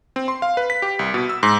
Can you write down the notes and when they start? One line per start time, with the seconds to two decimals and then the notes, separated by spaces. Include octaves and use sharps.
0.16 C4
0.28 C6
0.42 F5
0.57 B4
0.70 B6
0.82 G4
0.99 C2
1.14 B2
1.29 E6
1.43 G#2